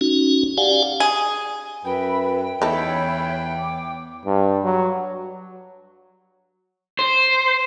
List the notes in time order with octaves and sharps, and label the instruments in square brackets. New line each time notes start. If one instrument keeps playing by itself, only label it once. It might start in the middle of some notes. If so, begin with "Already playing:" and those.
[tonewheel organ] C#4 D#4 F#4
G4 D5 F5 F#5 G#5
[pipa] G#4
[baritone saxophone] F#2 [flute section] B4 E5 B5 [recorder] G5
[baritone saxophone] E2 [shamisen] D#4 A4 [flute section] C#5 E5 B5
[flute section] D6
[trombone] G2
F#3
[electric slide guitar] C5